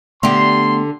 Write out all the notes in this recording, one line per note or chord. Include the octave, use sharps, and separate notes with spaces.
D3 A3 B3 G4 C6